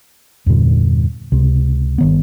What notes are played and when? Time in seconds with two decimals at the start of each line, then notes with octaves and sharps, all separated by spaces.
0.46 E2 G2 A#2 D3
1.32 C#2 C3
1.98 G1 D#3 B3